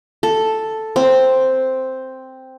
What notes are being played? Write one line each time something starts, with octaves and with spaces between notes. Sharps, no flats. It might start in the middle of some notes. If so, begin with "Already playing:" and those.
A4
C4